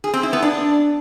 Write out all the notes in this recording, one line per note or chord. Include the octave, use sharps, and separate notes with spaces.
G#4
C4
E4
B3
D4